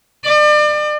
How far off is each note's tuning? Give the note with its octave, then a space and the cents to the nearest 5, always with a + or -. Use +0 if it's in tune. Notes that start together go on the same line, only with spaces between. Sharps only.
D5 +35